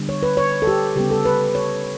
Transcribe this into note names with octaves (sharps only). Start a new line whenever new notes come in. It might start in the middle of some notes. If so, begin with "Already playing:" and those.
Already playing: D3 G3 B3
C#5
B4
C#5
A4
G4
C#3 G3 B3 G4
A4
B4
C#5